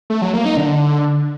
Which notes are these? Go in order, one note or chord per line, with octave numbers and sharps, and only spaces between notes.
A3
F#3
A#3
D#4
D3